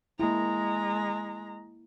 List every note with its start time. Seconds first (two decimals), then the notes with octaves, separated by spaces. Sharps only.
0.20 G#3 A#3 E4 A#5